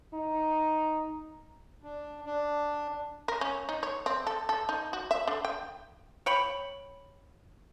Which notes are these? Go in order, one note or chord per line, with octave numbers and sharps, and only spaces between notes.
D#4
D4
D4
A#4
C#4
D#4
C#5
C4
A4
A4
D#4
F#4
E5
D3
G5
C#5 G5 B5